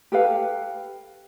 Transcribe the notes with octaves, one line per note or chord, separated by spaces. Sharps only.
G4 A4 B4 F5